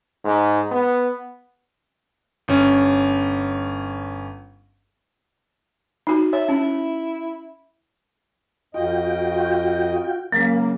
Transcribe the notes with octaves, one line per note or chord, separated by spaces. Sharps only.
G#2
B3
G1 C#4
D#4 F#4
C#5 E5
C#4 E4
F2 F4 F#4 D#5 G5
C#3 F#3 G#3 A#3